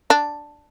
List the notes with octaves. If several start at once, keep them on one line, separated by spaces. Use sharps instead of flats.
D4